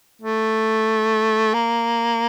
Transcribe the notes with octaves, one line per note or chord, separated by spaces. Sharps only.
A3
A#3